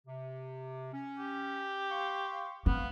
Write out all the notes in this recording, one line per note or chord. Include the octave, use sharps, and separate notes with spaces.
C3
C#4
G4
F5 C6 C#6
A3 B3 C4 F5